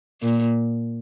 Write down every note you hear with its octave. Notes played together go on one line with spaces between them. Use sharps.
A#2